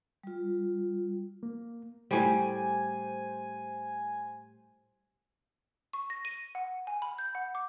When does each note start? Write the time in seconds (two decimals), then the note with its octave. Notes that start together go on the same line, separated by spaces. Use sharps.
0.23 G3 F4
1.43 A#3
2.11 A2 G3 C5 G#5
5.93 C#6
6.10 A#6
6.25 D#7
6.55 F#5
6.87 G#5
7.02 B5
7.18 G6
7.35 F#5
7.55 D6